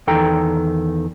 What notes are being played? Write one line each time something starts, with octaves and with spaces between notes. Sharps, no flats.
E2 D#3 A4 G5 A#5